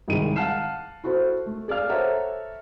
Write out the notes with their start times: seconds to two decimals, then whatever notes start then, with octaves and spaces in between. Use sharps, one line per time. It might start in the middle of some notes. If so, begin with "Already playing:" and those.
0.08 C2 G#2 D#3 G#3 E4 D#7
0.36 F5 F#5 A5 F6 C7 E7
1.04 E4 F#4 A4 C5
1.46 A3
1.68 G#4 D5 F5 F6
1.89 A4 C5 C#5 E5 F#5 A#5